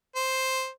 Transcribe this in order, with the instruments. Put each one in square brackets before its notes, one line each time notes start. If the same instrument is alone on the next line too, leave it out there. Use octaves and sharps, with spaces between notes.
[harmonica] C5